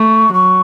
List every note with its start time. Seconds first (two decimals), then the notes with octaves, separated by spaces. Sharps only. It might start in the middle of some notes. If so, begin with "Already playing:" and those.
Already playing: A3 C#6
0.33 F#3 C#6